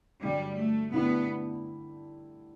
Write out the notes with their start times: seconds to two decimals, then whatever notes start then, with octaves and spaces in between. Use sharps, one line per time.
0.23 G2 D3 F#3 G3
0.59 A3
0.94 D3 A3 B3 E4 G4